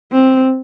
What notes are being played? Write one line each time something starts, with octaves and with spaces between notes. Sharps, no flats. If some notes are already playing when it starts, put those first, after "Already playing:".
C4